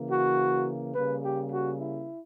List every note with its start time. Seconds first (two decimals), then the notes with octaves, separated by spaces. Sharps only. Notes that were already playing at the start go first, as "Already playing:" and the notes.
Already playing: C#3 E3 A#3
0.11 F#4
0.95 C#3 G3 A#3 B4
1.24 G4
1.52 F#4
1.80 E4